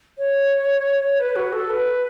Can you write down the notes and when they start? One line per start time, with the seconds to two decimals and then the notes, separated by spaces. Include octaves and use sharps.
0.18 C#5
1.19 B4
1.36 F#4
1.53 A4
1.70 B4